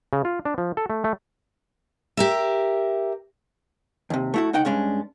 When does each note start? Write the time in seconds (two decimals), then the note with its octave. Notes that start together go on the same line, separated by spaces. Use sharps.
0.13 C#3
0.25 F4
0.45 D4
0.58 F3
0.77 A4
0.90 A3
1.04 A3
2.17 G4 A#4 E5
4.10 D#2 C3
4.34 A3 E4 F#4
4.53 C#2 D#4 F#5 G5
4.65 G2 G#3 C#4 D4